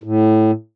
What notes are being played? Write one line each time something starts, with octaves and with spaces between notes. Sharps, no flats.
A2